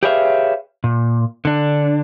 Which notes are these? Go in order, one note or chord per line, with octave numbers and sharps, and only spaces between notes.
G4 G#4 B4 C#5 E5 F5
A#2
D3 D4